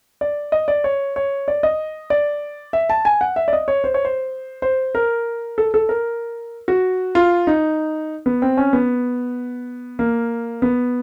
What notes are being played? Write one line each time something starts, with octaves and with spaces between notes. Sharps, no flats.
D5
D#5
D5
C#5
C#5
D5
D#5
D5
E5
A5
G#5
F#5
E5
D5
D#5
C#5
C5
C#5
C5
C5
A#4
A4
A4
A#4
F#4
F4
D#4
B3
C4
C#4
B3
A#3
B3